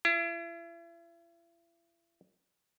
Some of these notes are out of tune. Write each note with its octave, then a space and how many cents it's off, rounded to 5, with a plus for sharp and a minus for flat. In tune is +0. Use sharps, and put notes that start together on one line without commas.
E4 +40